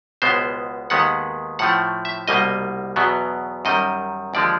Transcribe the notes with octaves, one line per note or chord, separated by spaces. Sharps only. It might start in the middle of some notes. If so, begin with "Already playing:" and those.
C#2 B2 G#3 B3 C5
D#2 D#3 G#3 B3 F#5
A2 F3 A3 F#5
E5
C2 B2 G3 A#3 D#5
E2 B2 F#3 B3
F#2 D#3 G3 D#5
D#2 D3 F3 G#3 D5